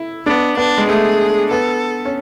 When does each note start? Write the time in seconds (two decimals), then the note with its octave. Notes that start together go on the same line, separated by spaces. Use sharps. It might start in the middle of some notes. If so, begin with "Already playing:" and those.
Already playing: E4
0.26 B3 D4
0.57 B3 D4
0.78 G#3
0.89 A3 G#4
1.51 B3 A4
2.05 C#4